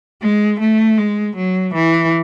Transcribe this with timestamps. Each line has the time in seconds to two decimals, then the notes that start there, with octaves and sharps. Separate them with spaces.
0.22 G#3
0.60 A3
0.98 G#3
1.36 F#3
1.74 E3